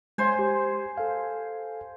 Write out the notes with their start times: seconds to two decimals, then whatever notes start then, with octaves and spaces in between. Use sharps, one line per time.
0.18 G#3 C5 G#5
0.39 G4
0.97 A4 F5